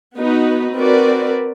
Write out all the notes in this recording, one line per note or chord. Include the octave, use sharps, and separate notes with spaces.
B3 D#4 F#4 B4
C4 F#4 A#4 B4 D5